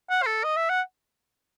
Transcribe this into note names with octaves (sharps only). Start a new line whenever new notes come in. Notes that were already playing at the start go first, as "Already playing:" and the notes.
F#5
C5
A4
D#5
E5
F#5